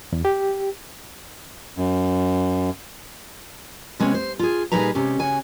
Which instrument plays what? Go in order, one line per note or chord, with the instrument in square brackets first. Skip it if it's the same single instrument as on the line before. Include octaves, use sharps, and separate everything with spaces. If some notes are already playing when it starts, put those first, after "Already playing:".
[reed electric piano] E2
G4
[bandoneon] F#2
[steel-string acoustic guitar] C3 G#3 B3 C#4
C5
F4 G#4
A#2 G3 D#4 G#4 B4 A#5
C3 G#3 C#4 G4
C#3 F#4 G#5